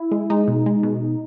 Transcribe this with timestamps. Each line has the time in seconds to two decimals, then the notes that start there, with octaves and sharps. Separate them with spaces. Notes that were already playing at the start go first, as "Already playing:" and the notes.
Already playing: E4
0.11 G#3
0.30 G#3 D#4
0.48 B2
0.66 G#3
0.83 B2